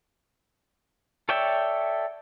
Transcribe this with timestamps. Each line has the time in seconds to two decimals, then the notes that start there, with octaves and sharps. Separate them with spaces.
1.29 A4 C#5 D5 E5 G5